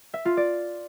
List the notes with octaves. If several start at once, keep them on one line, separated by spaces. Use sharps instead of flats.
E5
F4
D5